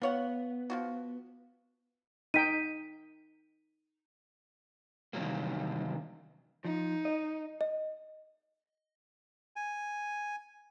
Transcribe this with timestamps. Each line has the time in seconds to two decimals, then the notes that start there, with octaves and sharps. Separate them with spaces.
0.02 B3 F4 C#5 F#5
0.70 F3 F4 F#4
2.34 D#4 G5 B6 D#7
5.13 C3 D#3 E3 F#3 G3 A#3
6.65 F3 D#4
7.05 D#5
7.61 D#5
9.56 G#5